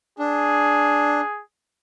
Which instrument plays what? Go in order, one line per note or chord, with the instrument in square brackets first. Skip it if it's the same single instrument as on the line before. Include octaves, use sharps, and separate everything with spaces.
[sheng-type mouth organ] D4 [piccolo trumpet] G#4